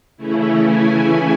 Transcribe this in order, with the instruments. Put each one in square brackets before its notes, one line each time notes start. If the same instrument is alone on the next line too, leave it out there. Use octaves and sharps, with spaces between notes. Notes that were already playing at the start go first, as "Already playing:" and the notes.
[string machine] C#3 E3 A3 C#4 E4
G#5